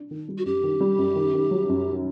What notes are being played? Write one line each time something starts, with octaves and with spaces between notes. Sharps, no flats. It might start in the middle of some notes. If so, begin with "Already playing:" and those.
Already playing: D4
D#3
G3
F#4
F#2 G4
D#3
G3
F#2
D#3
D#3
F#3
F#2